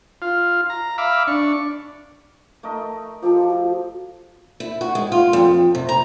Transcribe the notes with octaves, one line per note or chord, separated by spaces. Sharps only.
F4
A#5
E5 F5 B5 D6
D4 C#6
A3 A#4 D#5
F3 F4 G4 A4
F#4
E4
F#4
G#3
F4
F2
C3
A#5